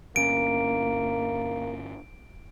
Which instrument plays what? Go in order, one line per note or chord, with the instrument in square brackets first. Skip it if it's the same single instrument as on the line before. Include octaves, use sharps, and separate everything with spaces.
[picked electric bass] G1 C#4 [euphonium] A#3 [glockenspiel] D7